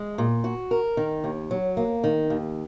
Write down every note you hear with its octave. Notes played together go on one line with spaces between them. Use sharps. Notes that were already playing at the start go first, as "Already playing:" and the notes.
Already playing: G#3
A#2
F#4
A#4
D#3
D#2
F#3
A#3
D#3
D#2